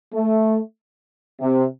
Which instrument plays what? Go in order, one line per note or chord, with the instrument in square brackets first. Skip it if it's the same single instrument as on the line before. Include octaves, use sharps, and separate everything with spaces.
[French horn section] A3
C3